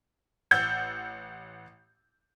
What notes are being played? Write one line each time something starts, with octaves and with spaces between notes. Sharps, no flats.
A1 F#5 E6 G6 A6